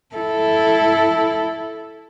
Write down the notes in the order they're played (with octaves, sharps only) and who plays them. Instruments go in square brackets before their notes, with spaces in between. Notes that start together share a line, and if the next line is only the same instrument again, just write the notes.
[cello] E4 A4